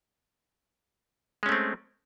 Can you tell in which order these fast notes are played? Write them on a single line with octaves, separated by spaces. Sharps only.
G#3 C#4 A3 C4